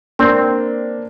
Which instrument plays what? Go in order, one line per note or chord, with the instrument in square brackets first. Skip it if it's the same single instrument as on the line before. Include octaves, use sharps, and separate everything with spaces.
[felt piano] A#3 D4 [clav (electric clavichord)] C4